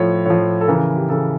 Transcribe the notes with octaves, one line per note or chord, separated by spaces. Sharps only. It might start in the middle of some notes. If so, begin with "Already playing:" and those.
Already playing: A2 F3 C#5
A2 F3 C#5
A4
C#3 E3 A#4
G4
C#3 E3 A4